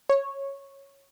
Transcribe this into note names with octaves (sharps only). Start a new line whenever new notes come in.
C#5